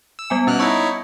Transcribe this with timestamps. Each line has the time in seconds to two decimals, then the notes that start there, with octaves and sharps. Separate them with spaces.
0.19 E6
0.30 G3 B3 G#5
0.47 B2 C#4 F6 F#6
0.59 D#4 E4 C#5 A5 C#6 E6